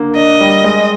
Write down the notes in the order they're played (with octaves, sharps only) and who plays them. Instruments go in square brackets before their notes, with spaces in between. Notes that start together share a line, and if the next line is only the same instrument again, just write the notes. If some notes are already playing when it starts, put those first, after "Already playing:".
Already playing: [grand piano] D3 A#3
[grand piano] D4 [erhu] D#5
[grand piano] G3
G#3